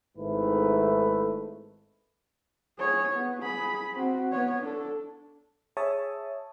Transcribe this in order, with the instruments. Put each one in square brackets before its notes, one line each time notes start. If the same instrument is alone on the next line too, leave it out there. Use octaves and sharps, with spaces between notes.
[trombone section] G#1 G#2 D#3 A3 E4 B4
[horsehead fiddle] G#4 C#5
B3
G#4 B5
C4 F#4
B3 C#5
D4 A4
[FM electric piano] G#4 C#5 E5 A5 D#6